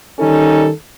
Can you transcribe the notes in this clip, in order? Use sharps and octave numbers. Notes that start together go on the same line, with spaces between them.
D#3 G3 C#4 D#4 A4